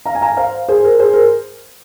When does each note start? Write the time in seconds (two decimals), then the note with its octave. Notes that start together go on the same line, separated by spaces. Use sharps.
0.06 F5 A#5
0.15 G#5
0.21 F5 A#5
0.37 C5 F5
0.68 G#4 C5
0.84 A#4
1.00 G#4 C5
1.14 A#4